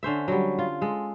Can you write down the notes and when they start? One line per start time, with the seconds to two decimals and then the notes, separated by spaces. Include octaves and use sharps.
0.03 D3 C#4 C5 E5
0.28 F#3 G3
0.59 F4
0.81 G#3 A4